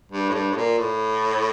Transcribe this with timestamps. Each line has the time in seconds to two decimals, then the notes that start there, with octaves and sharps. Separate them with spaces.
0.12 G2
0.30 A2
0.34 G2
0.52 A2
0.57 A#2
0.79 A2